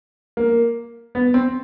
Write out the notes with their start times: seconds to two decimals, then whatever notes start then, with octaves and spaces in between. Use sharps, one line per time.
0.37 A#3
1.15 B3
1.34 C4